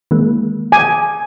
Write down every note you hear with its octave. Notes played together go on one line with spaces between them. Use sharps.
D#3 G#3 A#3
G#5 D6